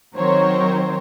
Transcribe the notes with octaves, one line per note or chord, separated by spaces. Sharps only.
D#3 F#3 C4 A#4 C5 C#5